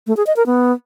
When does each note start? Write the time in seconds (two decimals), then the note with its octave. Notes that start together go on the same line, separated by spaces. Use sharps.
0.07 A3
0.17 G#4
0.27 D#5
0.36 A#4
0.46 B3